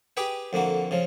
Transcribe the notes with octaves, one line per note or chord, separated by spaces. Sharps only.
G4 G#4 B4 G5
F2 D3 A#3 F#4
C#3 F3